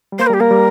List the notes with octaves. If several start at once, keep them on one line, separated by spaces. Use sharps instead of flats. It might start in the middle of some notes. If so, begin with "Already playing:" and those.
G3
A#3 C5
A#4
G3 G4
A#3 A#4
G3